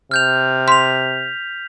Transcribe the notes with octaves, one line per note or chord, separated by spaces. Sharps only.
C3 F6 G6 F7
C6 B6 F7